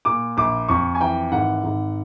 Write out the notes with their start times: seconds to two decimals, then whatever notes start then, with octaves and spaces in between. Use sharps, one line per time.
0.05 A#2 D6
0.37 A#1 D6
0.69 F2 C#6
0.95 G#5
1.00 E3 G5
1.32 G#1 F#5
1.64 G#1